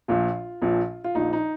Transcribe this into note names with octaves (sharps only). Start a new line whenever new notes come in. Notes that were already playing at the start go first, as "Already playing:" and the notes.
A#1 A#2 F3 F4
A#1 A#2 F3
F4
A#1 A#2 F3 D#4
D#4